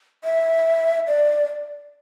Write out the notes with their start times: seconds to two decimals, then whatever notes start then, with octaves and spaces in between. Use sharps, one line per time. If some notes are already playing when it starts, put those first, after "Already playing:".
0.24 E5
1.07 D5